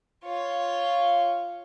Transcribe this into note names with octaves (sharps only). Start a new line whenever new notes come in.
F4 C#5